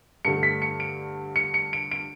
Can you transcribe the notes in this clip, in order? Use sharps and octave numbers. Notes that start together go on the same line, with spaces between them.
G2 D3 A3 C#7
B6
C#7
D7
C#7
C#7
D7
D7